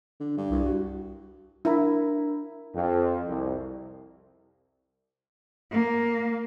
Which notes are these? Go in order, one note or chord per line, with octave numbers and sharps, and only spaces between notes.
D3
G2
C2
F#4
D4 E4 A#4 A#5
F2
C2
A#3